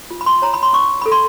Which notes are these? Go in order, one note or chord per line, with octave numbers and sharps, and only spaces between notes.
F4
B5
C6
C#5 A#5
B5
C6
C#4 C#6
A4 B5
C6